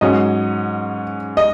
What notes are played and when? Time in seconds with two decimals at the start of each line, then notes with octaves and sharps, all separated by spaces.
0.01 G#2 F#3 C#4 D#5
1.37 D#5